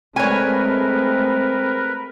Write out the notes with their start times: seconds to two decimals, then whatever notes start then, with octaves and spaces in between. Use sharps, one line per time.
0.16 G#3 A3 C4 A#4 B4 C#5 G#5